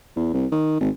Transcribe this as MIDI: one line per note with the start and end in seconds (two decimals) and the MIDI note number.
0.16 0.30 40
0.34 0.47 36
0.52 0.76 51
0.80 0.90 32